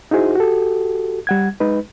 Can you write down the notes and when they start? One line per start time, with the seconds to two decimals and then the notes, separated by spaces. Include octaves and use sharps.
0.11 D#4 E4 F#4 G#4 C5
0.35 F#4 G4 A4
1.27 G3 F#5 G#6
1.60 G#3 D#4 B4